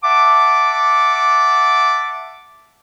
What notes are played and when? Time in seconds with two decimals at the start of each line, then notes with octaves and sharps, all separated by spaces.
0.03 E5 F#5 A5 D6